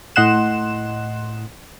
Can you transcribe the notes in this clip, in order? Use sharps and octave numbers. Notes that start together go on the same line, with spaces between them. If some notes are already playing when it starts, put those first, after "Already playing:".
A2 D#5 F#5 C6 F#6 E7